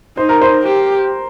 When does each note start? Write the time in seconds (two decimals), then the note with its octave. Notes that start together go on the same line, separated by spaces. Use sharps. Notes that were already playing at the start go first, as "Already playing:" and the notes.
0.17 D#4 C5
0.29 A#4
0.42 C5
0.63 G4